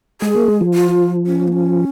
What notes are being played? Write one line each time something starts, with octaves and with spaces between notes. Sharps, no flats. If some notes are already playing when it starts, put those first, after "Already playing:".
G#3 G#4
A#3
G#3
F3
F4
C#4
A#3
C#4